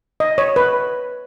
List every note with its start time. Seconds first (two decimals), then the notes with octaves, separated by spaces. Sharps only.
0.20 D#5
0.38 C#5
0.56 B4